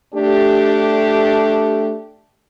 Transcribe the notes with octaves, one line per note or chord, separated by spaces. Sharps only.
A3 D4 G4